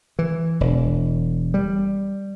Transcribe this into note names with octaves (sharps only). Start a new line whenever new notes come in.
E3
E1
G3